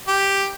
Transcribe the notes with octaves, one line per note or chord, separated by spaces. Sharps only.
G4